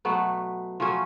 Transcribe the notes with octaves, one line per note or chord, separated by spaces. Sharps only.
B2 F#3 A3 B3
F3 F#3 A3 C#4